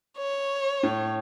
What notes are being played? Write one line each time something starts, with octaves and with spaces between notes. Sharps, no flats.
C#5
A2